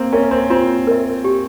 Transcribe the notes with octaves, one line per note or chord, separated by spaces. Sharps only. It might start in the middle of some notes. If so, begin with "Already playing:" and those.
Already playing: A#3 C4
C#4 A#4 E5
C4
C4 F4
A#4 E5
G4